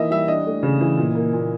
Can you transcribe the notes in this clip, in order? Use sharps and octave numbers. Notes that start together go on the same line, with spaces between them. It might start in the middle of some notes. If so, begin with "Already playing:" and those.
Already playing: E3 A#3 D#4 D#5 E5
G3 E5
D4 D#5
A3
C#3
E3
A#2
A#3
A#2